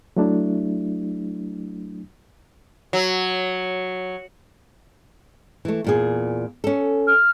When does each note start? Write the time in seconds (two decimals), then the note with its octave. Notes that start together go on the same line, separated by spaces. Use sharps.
0.17 F#3 A3 D4 E4
2.93 F#3
5.65 E3 A3
5.84 E2 A#2 G#4
6.64 C#4 A4
7.07 F6